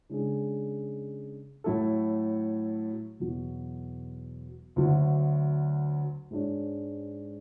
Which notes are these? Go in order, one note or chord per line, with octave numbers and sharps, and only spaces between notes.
C#3 G#3 D4 G#4
A2 F#3 A3 E4 A4
E2 B2 F#3
D2 D3 F#3
G#2 G#3 D4 F#4 C#5